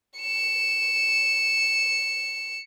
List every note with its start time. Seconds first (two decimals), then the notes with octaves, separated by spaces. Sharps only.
0.20 C#7 E7